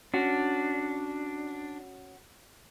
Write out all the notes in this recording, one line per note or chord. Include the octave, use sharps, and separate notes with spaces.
C#4 D4 F#4